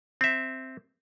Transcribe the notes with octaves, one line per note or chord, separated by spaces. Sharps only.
C4 E5